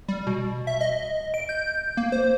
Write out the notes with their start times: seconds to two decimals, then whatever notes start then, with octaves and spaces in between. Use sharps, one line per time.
0.08 G3
0.27 B2
0.67 E5
0.81 D#5
1.34 D7
1.49 G6
1.97 A#3
2.12 C5